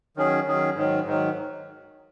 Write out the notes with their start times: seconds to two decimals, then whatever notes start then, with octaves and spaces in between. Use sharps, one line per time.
0.16 D#3 F#3 C#4 G#4
0.46 D#3 F#3 C#4 G#4
0.76 G#2 D#3 F#3
1.06 G#2 D#3 F#3